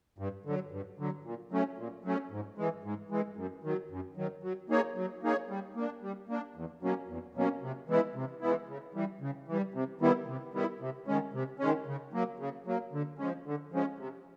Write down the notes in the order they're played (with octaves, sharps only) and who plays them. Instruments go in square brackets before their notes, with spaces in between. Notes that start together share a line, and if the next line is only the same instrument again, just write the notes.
[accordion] G2
D3 F#3
G2
D3 F#3
A#2
F#3 A3 C#4
A#2
F#3 A3 C#4
G#2
E3 G#3
G#2
E3 G#3
F#2
D#3 F#3
F#2
D#3 F#3
F#3
A#3 D#4 G#4 C#5
F#3
A#3 D#4 G#4 C#5
G3
A#3 D4
G3
A#3 D4
E2
B2 F#3 A#3 C#4
E2
B2 F#3 A#3 C#4
C3
E3 G#3 B3 E4
C3
E3 G#3 B3 E4
C#3
E3 G3
C#3
E3 G3
C3
D#3 G3 B3 E4
C3
D#3 G3 B3 E4
C3
D#3 G#3 C#4
C3
D#3 G#3 C#4
C#3
F#3 A#3
C#3
F#3 A#3
D3
F3 G#3 C#4
D3
F3 G#3 C#4
C3